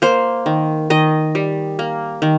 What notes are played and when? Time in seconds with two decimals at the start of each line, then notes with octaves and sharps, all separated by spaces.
0.02 A#3 C5
0.46 D#3
0.90 D#3 D#5
1.35 G3
1.79 A#3
2.22 D#3